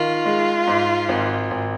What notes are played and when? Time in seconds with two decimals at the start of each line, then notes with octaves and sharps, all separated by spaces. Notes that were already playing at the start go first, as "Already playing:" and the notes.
Already playing: D#3 F4
0.25 G#3
0.67 G#2
1.09 G#1
1.51 G#1